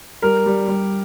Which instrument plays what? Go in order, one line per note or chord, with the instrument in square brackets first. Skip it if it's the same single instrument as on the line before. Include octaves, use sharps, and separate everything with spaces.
[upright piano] G3 A#4
G3
G3